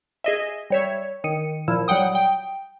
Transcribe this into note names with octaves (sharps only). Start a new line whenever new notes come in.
G#4 D#5 E5
G3 C#5 E5
D#3 C#7 D#7
A#2 F3 E4
F#3 G3 F#5 G5 D#6
G5